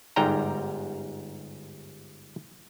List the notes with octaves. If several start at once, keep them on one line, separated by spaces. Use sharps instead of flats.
G1 G#2 G3 G5 A#5